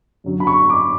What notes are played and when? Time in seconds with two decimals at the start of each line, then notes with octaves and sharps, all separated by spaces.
0.24 F#2 D3 F#3
0.40 B5
0.47 C#6
0.70 D6